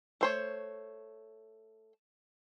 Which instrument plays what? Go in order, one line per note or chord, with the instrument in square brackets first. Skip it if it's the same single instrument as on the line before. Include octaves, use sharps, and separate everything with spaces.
[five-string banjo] A3 C5 C#5